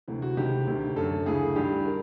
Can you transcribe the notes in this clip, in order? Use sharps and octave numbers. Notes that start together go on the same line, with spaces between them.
D2 C3 E3
F#4
C#2 C3 D#3 G4
D2 C3 D#3
F#2 D3 A4
D2 C#3 E3 G#4
G2 D#3 G4
A#4